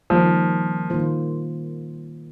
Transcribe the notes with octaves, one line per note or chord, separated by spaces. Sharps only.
D#3 F3 G3 A#3 D#4
D#3 A#3 F4 C5